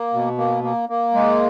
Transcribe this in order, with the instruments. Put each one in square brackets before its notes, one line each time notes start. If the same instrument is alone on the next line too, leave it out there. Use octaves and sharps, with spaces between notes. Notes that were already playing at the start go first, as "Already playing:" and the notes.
Already playing: [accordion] A#3
B2
A#3
A#3
A#3
G#3